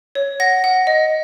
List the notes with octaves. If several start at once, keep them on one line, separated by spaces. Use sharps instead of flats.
C#5
F#5 A#6
F#5
D#5